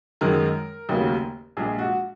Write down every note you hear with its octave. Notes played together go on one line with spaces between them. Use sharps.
F#2 D#3 G#3 A#4
F1 D#2 C#3 F#3 A#3
A#1 A#2 G#3 G#4
F#4